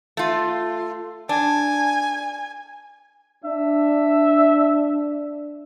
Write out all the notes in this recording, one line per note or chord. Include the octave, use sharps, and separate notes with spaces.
A3 F4
D4 G#5
D4 E5